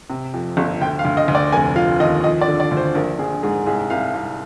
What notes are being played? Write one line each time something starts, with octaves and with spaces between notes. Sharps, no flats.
C3
F2
G1
D2 G5
F5
D2
D#5
D2
D5
F1 G#5
F3 F5
D#2 D#5
F3 D#5
D5
D3
D5
D2
C5
A#1 A#4
A#1 G#4
G#2 G#4
C2 G#4
C2 F5
C2